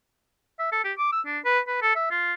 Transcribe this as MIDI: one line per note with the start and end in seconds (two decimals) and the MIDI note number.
0.59 0.70 76
0.72 0.81 69
0.84 0.93 67
0.98 1.12 86
1.12 1.21 88
1.26 1.39 62
1.45 1.60 71
1.68 1.79 71
1.82 1.93 69
1.96 2.09 76
2.11 2.34 65